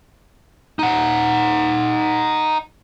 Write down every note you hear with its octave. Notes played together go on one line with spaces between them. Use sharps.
D#4 F#5